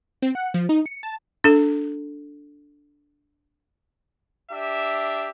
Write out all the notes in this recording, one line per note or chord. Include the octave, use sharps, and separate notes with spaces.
C4
F#5
F3
D#4
C#7
A5
D4 A4
D4 G4 E5